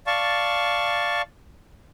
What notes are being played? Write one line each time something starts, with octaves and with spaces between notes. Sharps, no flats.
D5 F5 A5 C#6